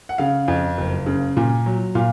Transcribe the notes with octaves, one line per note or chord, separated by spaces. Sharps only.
F#5
C#3 F5
F2
F#1
C#3
A#2
F#3
A#2 F5